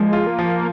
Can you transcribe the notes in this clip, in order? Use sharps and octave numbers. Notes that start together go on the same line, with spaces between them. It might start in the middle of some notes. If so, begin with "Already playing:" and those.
Already playing: F3 G#3 A#3
F4
A#3
F3